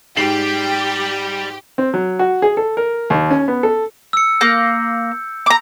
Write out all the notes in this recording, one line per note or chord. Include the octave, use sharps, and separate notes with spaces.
G#2 G3 G4 C7 F#7
C4
F#3
F#4
G#4
A4
A#4
D#2
C#4
B3
A4
E6 C#7
A#3 G6
A#5 D6